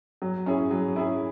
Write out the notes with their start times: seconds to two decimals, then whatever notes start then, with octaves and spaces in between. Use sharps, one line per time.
0.22 F#3
0.46 C#4 E4 G#4
0.71 F#3
0.95 C#4 E4 G#4